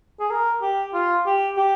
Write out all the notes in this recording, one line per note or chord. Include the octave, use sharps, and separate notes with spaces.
G#4
A#4
G4
F4
G4
G4